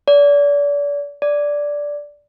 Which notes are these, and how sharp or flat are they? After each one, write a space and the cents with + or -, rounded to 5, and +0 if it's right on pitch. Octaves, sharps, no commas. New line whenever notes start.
D5 -35
D5 -5